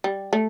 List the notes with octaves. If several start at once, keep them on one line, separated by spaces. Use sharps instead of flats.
G3
A3